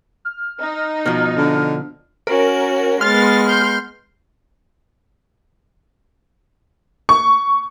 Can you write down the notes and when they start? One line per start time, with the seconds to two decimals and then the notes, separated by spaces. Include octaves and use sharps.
0.25 F6
0.60 D#4
1.06 B2 F3 F6
1.37 D3
2.27 C#4 F#4 A#4
3.01 G#3 B3 C6 F6 A6
3.47 C6 G6
7.09 C#6